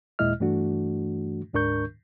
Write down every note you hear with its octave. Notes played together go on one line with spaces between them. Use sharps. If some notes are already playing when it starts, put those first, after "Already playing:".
D#2 A#2 G#3 E4 D#5 F6
G2 E3 A3 D4 F#4
D2 G#2 D4 A#4 C#6 G6